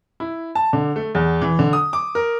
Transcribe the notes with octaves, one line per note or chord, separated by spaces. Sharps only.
E4
A5
D3
A3
E2
E3
D3
D#6
D6
A#4